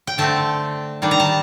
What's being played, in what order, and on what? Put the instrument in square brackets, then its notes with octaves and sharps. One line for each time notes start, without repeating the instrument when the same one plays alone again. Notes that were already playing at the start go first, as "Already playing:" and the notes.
[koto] G5
D3 A3 C4 A5
D#3 G3 D4
A#5
A5